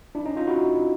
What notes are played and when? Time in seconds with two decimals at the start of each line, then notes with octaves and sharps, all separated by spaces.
0.15 D4 E4
0.26 C#4 D#4
0.36 D#4 F4
0.47 E4 F#4